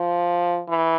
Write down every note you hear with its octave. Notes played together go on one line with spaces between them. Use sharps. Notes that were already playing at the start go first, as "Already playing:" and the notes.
Already playing: F3
E3